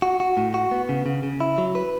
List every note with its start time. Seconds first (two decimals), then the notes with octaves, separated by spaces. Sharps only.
0.02 F#4
0.20 F#4
0.37 A2
0.54 F#4
0.71 B3
0.89 C#3
1.06 C#3
1.23 C#3
1.40 E4
1.58 F#3
1.75 B4